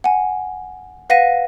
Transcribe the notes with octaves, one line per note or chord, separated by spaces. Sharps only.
F#5 G#5
B4 F5 F#5 A#6 B6 D#7